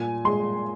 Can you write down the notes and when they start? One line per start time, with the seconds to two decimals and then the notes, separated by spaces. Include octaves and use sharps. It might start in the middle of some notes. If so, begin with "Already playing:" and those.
Already playing: A#2 G#5
0.25 G#3 C6